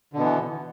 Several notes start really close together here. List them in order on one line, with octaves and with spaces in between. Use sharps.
D3 B2 B3 E3